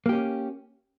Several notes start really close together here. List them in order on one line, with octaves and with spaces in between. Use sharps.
A#3 G4 C#4